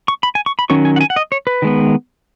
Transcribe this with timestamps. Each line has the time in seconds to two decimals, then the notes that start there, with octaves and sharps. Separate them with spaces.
0.08 C#6
0.23 B5
0.35 G#5
0.46 C#6
0.59 B5
0.70 D#3 F#3 C#4 C#6
0.85 G#5
0.96 F#5
1.01 G#5
1.10 F#5
1.16 D#5
1.32 C#5
1.47 B4
1.62 D#3 G#3 B3